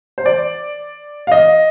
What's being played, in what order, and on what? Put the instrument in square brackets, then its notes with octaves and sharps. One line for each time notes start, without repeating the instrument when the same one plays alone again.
[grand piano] C5
D5
F5
D#5